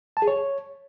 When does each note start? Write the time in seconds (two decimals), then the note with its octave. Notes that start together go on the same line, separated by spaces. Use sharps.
0.17 A5
0.22 G#4
0.28 C#5